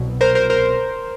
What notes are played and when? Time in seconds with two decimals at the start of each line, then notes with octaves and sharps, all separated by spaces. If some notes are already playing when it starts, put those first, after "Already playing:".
Already playing: C2 B2 F#3
0.21 A#4 C5
0.35 A#4 C5
0.50 A#4 C5